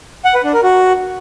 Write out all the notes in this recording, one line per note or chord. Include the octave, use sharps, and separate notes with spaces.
F#5
B4
D4
A#4
F#4